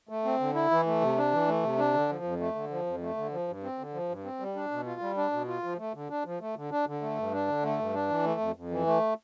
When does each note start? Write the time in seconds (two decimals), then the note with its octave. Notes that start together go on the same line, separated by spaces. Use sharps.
0.09 A3
0.25 C4
0.40 D3
0.55 E4
0.71 E3
0.86 A3
1.01 C3
1.17 D4
1.32 E3
1.48 A3
1.63 C3
1.78 D4
1.94 D3
2.09 F3
2.24 F2
2.40 A3
2.55 D3
2.71 F3
2.86 F2
3.02 A3
3.17 D3
3.32 F3
3.48 G2
3.63 C4
3.79 D3
3.93 F3
4.09 G2
4.24 C4
4.40 G3
4.56 D4
4.71 B2
4.86 F4
5.01 G3
5.17 D4
5.32 B2
5.48 F4
5.63 F3
5.79 A3
5.94 D3
6.10 D4
6.25 F3
6.41 A3
6.56 D3
6.71 D4
6.87 D3
7.02 A3
7.18 G2
7.33 D4
7.48 D3
7.63 A3
7.79 G2
7.94 D4
8.09 E3
8.24 A3
8.40 F2
8.56 F2
8.71 E3
8.87 A3